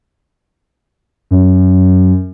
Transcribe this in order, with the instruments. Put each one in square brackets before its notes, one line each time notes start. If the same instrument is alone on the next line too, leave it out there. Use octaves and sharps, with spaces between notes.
[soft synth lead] F#2